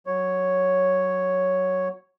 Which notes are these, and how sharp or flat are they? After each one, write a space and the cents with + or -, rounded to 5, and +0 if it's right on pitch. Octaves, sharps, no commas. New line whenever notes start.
F#3 +0 C#5 +0